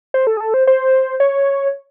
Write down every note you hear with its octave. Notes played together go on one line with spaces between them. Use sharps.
C5
A4
G#4
A4
C5
C5
C#5